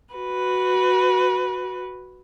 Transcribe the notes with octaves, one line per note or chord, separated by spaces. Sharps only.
F#4 B4